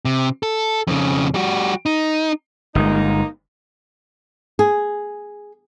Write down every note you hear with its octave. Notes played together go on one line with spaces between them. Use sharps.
C3
A4
F2 C#3
G3 F#4
D#4
G1 G#3 A#3 D#4
G#4